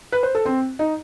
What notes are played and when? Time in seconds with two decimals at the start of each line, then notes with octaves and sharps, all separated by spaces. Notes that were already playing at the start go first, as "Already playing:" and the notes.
0.12 B4
0.23 C5
0.35 A4
0.45 C4
0.79 D#4